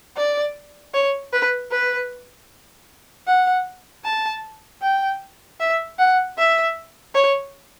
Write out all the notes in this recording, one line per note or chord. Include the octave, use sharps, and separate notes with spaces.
D5
C#5
B4
B4
F#5
A5
G5
E5
F#5
E5
C#5